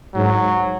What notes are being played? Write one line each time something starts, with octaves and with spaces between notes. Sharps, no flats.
G#2 F#3